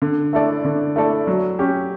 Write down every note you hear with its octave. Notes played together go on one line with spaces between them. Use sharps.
D3
A3 E4 A4 D5
D3
A3 E4 A4 D5
F#3
C#4 G4